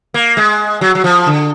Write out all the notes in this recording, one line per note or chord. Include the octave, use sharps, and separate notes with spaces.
A#3
G#3
F#3
F#3
F3
D3